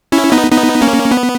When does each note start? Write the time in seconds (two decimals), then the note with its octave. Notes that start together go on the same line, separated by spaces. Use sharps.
0.12 C#4 E4
0.32 B3 D#4
0.52 B3 D#4
0.82 A#3 C#4
1.11 B3